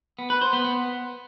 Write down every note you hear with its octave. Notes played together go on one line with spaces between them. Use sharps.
B3
B4
C5
B3
B3